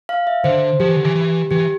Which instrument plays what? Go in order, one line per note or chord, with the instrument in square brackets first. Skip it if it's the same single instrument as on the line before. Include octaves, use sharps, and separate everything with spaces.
[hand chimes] F5
E5
[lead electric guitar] D3 [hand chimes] C5
[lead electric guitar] F3 [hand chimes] G4
[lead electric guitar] E3
D3
E3
E3
[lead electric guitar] E3 [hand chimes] G4